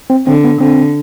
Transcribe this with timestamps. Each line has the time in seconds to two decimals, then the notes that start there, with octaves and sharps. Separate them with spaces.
0.10 C4
0.27 D3 C4
0.44 B3
0.61 D3 C4